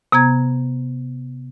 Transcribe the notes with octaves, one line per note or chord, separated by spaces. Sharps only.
C3 B3 A#5 G#6